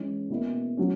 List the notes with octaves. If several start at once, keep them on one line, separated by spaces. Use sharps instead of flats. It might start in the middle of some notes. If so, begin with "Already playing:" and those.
Already playing: E3 G#3 C#4
B2 A#3 E4
F#3 C#4